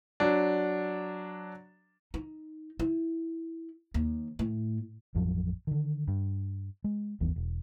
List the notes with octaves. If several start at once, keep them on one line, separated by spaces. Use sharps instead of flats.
F#3 D4
D#4
E4
D#2
A2
A1 F2 F3 F#3
D3 D#3
G2
G#3
G1 D#2 E3 B3
E1